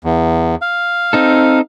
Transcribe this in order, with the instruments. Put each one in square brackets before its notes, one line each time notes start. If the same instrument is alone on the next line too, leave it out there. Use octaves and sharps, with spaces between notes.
[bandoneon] E2
F5
[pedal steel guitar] C4 D#4 A4